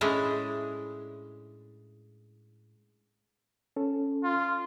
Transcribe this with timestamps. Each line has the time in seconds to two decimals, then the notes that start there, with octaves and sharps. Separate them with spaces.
0.01 A2 G#3 C#4 D4 E4
3.76 C#4 A4
4.24 F4